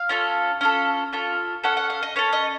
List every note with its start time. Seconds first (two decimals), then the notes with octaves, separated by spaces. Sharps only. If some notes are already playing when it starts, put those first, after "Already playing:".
Already playing: F5
0.09 C#4 F4 A4
0.61 C#4 F4 A4
1.13 C#4 F4 A4
1.64 C#4 A4 F#5
1.77 F#5
1.90 F5
2.03 D#5
2.16 C#4 A4 C#5
2.33 D#5